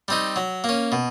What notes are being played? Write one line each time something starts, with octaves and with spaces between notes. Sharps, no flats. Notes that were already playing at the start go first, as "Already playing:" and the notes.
G3 C4 D#4
F#3
A#3 C#4
B2